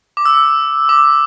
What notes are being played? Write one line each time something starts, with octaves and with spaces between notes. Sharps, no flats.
D6
E6
D6